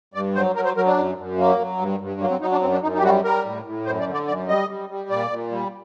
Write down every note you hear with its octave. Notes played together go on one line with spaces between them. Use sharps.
G2 D5
F#3 C5
F#3 A#4
C5
F#3 A#4
D4
F#2
F#2
F#3 A#3
F#3
G2
G2
F#3 A#3
C4
F#3 D#4
D4
F#2 C4
D4
F#2 D#4
D#4
G4
G3 F#4
G3 A#4
A2
A2
F#2 C5
D5
D3
D5
F#2 D5
G3 D#5
G3
G3
A#2 D5
A#2
G3